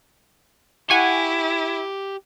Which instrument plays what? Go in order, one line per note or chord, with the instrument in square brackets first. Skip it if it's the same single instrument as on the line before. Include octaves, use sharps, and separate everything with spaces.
[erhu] E4 [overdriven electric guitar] G4 [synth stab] F#5 G#5 C#6